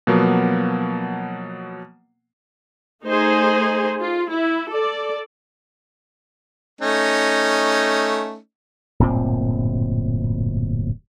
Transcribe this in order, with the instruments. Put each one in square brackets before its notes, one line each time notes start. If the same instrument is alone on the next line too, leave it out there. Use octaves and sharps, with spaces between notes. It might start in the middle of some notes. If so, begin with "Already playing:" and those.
[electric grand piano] B2 F3 F#3 A#3 B3
[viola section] A3 D#4 G#4 C5
F4
E4
A4 D5
[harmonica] A3 C#4 D#4
[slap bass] D1 G1 A#2 C4